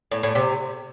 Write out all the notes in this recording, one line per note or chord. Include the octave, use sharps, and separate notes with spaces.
A2
A2
C3